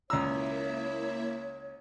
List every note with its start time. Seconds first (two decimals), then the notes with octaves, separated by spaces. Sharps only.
0.10 C#2 A#3 E4 C#5 E5 A#5 E6